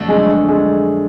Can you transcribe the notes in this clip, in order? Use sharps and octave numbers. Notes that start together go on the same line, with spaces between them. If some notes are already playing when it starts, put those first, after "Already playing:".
Already playing: F2 D3 F#3 A3 D4
G#3
G#3